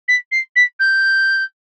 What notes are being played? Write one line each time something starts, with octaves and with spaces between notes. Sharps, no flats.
B6
C7
B6
G6